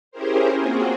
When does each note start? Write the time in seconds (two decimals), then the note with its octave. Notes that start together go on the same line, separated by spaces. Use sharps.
0.11 C#4 E4 G4 G#4 A#4 C5
0.59 A#3 C4 F4 F#4 G#4